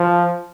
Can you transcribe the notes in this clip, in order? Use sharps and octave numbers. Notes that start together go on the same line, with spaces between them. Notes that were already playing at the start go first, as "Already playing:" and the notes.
Already playing: F3